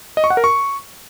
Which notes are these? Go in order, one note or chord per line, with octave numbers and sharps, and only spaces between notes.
D#5
C#6
F#5
A#4
C#6